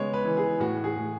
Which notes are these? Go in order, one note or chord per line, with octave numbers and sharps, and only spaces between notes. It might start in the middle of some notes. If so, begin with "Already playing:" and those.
Already playing: C#3 G#3 B3 C#5
B4
E3
G#4
A2 F#4
G#4
A2